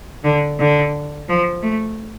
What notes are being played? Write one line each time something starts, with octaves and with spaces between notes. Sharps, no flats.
D3
D3
F3
A3